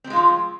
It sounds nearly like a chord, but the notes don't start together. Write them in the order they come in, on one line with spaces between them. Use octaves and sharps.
C4 G3 G#3 F4 F3